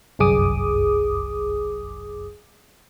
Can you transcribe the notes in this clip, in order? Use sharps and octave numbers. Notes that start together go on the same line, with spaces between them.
G1 C2 F#2 G#4 D6 D#6